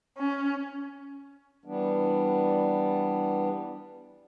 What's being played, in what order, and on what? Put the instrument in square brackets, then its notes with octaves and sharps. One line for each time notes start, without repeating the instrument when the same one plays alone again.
[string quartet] C#4
[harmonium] E3 G3 B3 D4